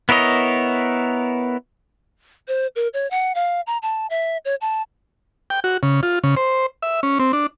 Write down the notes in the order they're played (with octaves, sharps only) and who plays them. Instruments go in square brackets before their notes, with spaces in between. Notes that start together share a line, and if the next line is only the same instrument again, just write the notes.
[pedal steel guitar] B3 E4 A#4 C#5 D#5
[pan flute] C5
A#4
C#5
F#5
F5
A#5
A5
E5
C#5
A5
[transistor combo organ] G5
F#4
C#3
F4
C#3
C5
E5
C#4
C4
D4